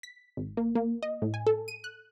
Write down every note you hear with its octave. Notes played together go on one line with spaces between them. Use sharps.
B6
G#1
A#3
A#3
D#5
A2
G#5
A4
D#7
F#6